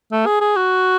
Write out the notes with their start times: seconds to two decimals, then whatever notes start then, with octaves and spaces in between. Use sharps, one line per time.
0.12 A3
0.26 G#4
0.40 G#4
0.56 F#4